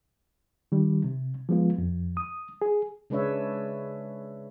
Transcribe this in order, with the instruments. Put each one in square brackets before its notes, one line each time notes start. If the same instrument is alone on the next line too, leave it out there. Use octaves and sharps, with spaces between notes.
[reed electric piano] D#3 G3
C3
F3 G#3 B3 F4
F2
D#6
G#4
[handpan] C#3 G#3 D4 B4 C#5 E5